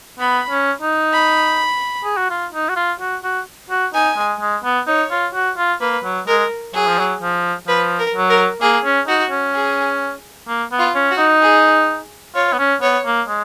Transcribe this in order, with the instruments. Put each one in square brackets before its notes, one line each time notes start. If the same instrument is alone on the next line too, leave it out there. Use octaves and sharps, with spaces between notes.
[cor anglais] B3 [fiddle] B5
[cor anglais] C#4
D#4
[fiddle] B5
[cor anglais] G#4
F#4
F4
D#4
F#4
F4
F#4
F#4
F#4
[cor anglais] D#4 [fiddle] G#5
[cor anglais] G#3
G#3
B3
[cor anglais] D#4 [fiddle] C#5
[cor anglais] F4
F#4
F4
[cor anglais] A#3 [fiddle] B4
[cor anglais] F#3
[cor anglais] G#3 [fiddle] A#4
[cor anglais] F#3 [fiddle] G#4
[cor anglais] F3
F#3
F3
[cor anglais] F3 [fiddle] B4
[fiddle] A#4
[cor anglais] F#3
[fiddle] A#4
[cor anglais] A#3 [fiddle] G#4
[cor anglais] C#4
[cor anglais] D#4 [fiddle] F#4
[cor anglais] C#4
[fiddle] G#4
[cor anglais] A#3
B3
[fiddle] F4
[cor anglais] C#4
[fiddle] F#4
[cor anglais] D#4
[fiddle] G#4
[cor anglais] F4 [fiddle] C#5
[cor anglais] B3
C#4
[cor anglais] B3 [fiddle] C#5
[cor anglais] A#3
G#3